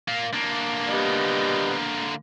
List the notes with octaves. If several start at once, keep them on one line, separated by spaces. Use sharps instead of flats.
A#3 F4
D3 A#3
G3 B3 D#5